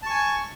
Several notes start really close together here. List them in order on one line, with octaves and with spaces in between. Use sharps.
A5 C#6 G#5